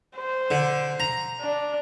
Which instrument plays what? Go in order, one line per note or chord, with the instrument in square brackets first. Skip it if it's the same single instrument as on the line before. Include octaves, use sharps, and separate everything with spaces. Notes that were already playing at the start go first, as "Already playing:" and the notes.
[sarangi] C5
[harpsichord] D3
A#5
[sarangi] D4